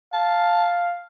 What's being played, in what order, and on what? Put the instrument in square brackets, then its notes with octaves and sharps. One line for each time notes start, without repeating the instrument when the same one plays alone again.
[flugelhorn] F5 [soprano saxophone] A5